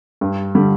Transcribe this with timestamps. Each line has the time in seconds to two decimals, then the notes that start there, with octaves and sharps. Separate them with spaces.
0.21 G2
0.55 D3 G3